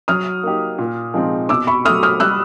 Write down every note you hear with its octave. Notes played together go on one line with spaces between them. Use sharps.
F#3 D#6 F6
A#3 D#4 G4
A#2
F3 G#3 C4 D#4
B2 D6 E6
B5 C#6
F#3 A3 D#6 F6
D#6 F6
G3 E6 F#6